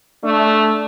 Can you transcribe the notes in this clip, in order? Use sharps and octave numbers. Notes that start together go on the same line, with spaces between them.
A3 D4